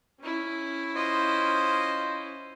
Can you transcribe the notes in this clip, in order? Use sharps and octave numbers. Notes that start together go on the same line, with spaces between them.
C#4 E4
F4 C5 D#5